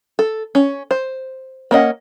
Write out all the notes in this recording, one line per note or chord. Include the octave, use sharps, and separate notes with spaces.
A4
C#4
C5
A#3 C#4 D#5 F#5